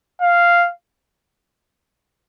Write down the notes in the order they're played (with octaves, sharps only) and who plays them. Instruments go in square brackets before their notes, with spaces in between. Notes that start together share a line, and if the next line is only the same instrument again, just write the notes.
[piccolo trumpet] F5